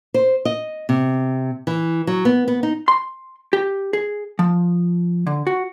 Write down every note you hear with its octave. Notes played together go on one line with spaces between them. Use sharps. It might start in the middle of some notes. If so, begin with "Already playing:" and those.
C5
D#5
C3
E3
F#3
B3
B3
D#4
C6
G4
G#4
F3
D3
F#4